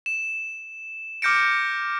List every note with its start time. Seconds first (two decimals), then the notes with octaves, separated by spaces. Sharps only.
0.06 E7
1.22 D6 F6 G6 A#6 C#7 D7